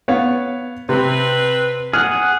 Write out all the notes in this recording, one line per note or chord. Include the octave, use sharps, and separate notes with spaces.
B3 C#5 F5
C3 C4 B4
G#4 F#5 F6